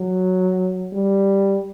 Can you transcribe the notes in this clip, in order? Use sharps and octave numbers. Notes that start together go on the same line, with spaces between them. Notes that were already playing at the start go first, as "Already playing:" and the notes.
Already playing: F#3
G3